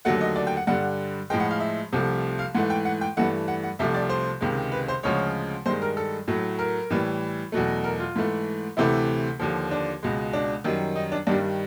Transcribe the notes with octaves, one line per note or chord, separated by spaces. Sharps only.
D#2 D3 F#3 A3 F#5
D#5
D5
G5
F#5
G2 D3 G3 F#5
A2 F3 G#3 G5
F#5
F5
E5
C2 C3 F3 A3
F5
G#2 E3 A3 F#5
G5
F#5
G5
G2 E3 A3 F#5
F#5
F#5
C2 C3 F3 A3 E5
D5
C5
C#2 C3 D#3 G#3
B4
C5
D2 C#3 F3 G#3 C#5
G2 D#3 G#3 C5
A#4
A4
A2 F#3 A3
A#4
A2 E3 G3
E2 B2 F#3 A3
A#4
F4
G#2 E3 A3
D2 C3 E3 A3 E4
D#2 D3 F3
D4
C#2 B2 G#3
D4
F#2 D#3 G3
D#4
D4
G2 D#3 G3 D4